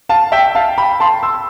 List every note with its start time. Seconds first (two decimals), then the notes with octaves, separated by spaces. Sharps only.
0.09 F5 A5
0.32 E5 G5
0.55 F5 A5
0.78 G5 B5
1.00 A5 C6
1.23 C6 E6